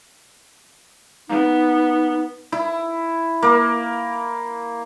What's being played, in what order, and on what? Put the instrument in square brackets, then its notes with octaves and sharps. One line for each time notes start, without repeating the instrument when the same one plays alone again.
[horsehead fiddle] B3 [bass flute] D#4
[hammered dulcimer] E4
A#3